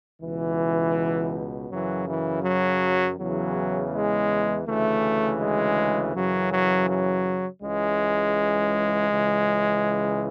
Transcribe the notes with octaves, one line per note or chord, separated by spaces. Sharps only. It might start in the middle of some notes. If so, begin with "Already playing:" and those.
C#2 B2 E3
F#2 C#3 E3 F#3
E3
F#3
E2 C#3 E3 F#3
G#3
D2 C#3 E3 A3
G#3
F#2 C#3 E3 F#3
F#3
F#3
C#2 C#3 E3 G#3
C#2 C#3 E3